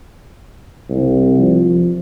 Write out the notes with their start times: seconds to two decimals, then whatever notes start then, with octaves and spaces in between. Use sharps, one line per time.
0.89 C2
1.39 F3